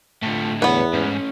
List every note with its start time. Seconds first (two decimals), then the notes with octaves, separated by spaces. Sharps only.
0.23 A2 D3 F3 A3
0.62 E2 B3 B4 C#5
0.93 G#2 A3 C#4